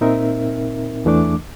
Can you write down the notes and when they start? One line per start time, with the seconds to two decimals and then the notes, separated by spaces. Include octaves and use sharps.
0.01 A#2 C4 D#4 A#4 E5
1.05 E2 E3 A3 D4 D6